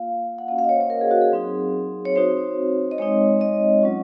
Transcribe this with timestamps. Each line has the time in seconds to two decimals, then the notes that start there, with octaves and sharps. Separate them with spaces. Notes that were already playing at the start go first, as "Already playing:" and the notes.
Already playing: A#3 F4 F5
0.38 F#5
0.48 A#3 C#4 F#4 F5
0.58 F5
0.64 D#5
0.69 C#5
0.76 C5
0.81 C#5
0.90 A#4
1.01 G#4
1.11 F#4
1.22 G#4
1.32 F#3 C4 D#4
2.05 C#5
2.16 C4 D#4 F#4 C5
2.91 D#5
2.98 G#3 C4 D#4 C#5
3.41 D#5
3.82 F#3 C#4 F4